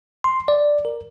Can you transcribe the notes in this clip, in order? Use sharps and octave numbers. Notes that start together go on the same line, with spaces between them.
C6
D5
A#4